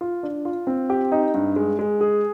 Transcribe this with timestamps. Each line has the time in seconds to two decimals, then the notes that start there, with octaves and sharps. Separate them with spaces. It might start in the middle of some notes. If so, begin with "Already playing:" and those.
0.01 F4
0.23 D4
0.45 F4
0.67 C4
0.90 G4
1.12 D#4
1.34 G2
1.56 G#3
1.79 G#3
2.01 G#4